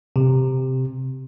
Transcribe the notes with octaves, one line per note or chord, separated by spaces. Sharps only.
C3